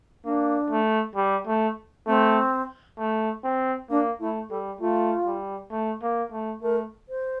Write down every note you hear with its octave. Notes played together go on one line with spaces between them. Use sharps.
A#3 D4
A3
G3
A3
A3 C4
A3
C4
A#3 D4
A3 E4
G3 A4
A3 F4
G3
A3
A#3
A3
A3 A#4
C5